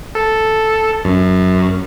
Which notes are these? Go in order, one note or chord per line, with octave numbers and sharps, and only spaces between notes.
A4
F#2